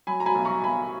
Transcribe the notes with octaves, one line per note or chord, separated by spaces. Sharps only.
F#3 G#5 B5
A#5
G#5 B5
B1
A#5 C#6
B1 G#5 B5